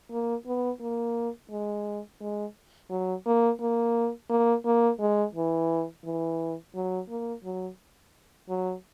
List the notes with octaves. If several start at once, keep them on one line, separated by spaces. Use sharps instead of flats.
A#3
B3
A#3
G#3
G#3
F#3
A#3
A#3
A#3
A#3
G#3
E3
E3
F#3
A#3
F#3
F#3